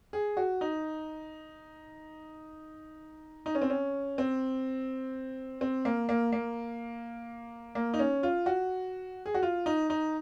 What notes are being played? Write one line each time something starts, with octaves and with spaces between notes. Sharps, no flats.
G#4
F#4
D#4
D#4
C#4
C4
C#4
C4
C4
A#3
A#3
A#3
A#3
D#4
C#4
F4
F#4
G#4
F#4
F4
D#4
D#4